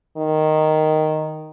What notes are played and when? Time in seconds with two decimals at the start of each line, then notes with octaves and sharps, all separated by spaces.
0.17 D#3